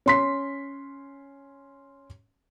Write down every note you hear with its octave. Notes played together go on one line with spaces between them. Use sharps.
C#4 C6 B6